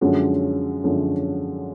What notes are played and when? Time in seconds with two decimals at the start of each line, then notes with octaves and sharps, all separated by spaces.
0.01 F#2 D3 F3 G#3 C#4 F#4
0.84 F#2 D3 F3 G#3 C#4